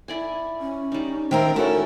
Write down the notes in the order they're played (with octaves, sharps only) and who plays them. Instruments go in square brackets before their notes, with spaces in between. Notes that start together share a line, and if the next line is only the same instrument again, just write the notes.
[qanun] E4 D5 G#5
[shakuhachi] C#4
[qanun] G3 D#4
[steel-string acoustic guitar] D#3 C4 A#4 [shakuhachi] E5
[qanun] A3 C#4 A4 [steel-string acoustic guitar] E4 [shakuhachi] F#4 [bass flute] A#4